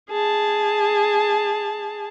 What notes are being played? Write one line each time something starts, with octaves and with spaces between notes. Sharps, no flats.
G#4 A5